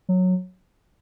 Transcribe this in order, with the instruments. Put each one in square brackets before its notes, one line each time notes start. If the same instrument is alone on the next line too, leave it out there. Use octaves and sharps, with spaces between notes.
[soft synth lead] F#3